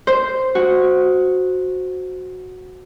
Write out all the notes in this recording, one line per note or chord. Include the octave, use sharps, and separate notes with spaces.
C5
F#4